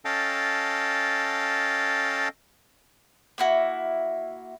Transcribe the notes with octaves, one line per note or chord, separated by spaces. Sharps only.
C#4 A4 D#5 F5 G5 A5
A#3 E4 F#4